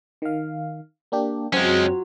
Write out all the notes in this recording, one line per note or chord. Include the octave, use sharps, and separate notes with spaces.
D#3 F5
A#3 D4 G4
F#2 F#3 G#3 C4 C#4 F4